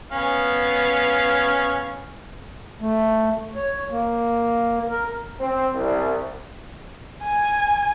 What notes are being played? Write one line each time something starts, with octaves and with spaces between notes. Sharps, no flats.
B3 C#4 F5
A3
C#5
A#3
A#4
C4
C2
G#5